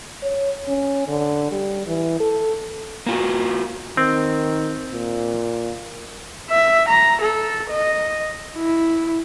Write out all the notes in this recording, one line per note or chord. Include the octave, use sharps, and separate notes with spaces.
C#5
C#4
D3
G3
E3
A4
A#3 F4 F#4
D#3 C4
A#2
E5
A#5
A4
D#5
E4